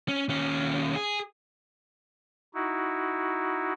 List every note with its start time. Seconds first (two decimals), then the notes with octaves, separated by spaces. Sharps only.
0.08 C#4
0.29 D#2 C#4
0.96 G#4
2.54 D#4 E4 F#4